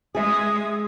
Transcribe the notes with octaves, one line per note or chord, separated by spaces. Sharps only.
G#3 G#4 E5 D#6